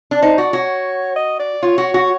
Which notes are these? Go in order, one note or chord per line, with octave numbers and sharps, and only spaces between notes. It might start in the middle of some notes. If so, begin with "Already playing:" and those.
D4
D#4 C5
F#4 D5
F#4 C#5
D#5
D5
F4 C#5
F#4
F#4